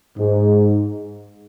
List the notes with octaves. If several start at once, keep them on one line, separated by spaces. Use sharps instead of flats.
G#2